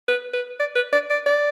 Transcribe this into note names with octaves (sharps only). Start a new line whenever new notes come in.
B4
B4
D5
B4
D5
D5
D5